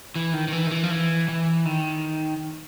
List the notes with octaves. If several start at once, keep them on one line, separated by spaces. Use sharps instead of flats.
E3
D#3
D#3
E3
D#3
E3
F3
E3
E3
D#3